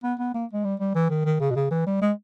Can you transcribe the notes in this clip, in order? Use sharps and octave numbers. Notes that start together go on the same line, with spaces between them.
B3
B3
A#3
G#3
G3
G3
E3
D#3
D#3
C#3
B2
C#3
E3
G3
G#3